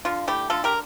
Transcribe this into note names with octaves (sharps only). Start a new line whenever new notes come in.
D3 F4
A3 E4 G4
D3 F4 A4
G4 A#4